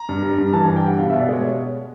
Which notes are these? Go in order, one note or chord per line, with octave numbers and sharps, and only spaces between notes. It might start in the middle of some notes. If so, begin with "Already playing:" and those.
Already playing: A#5
G2
G3
G2
E3 A5
G2 G#5
G5
G3 F#5
B2 F5
B2 E5
D5
G#3 C#5